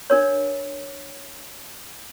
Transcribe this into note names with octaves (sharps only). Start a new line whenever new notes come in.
D4 A#4 C#5